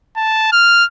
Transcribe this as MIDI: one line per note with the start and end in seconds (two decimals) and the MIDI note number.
0.17 0.49 81
0.52 0.84 89